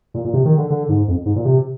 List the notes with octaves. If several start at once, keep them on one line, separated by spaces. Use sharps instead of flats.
A#2
A#2
C3
D#3
D3
D3
G#2
F2
G#2
A#2
C3